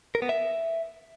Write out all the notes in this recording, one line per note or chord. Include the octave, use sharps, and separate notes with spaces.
A#4
B3
E5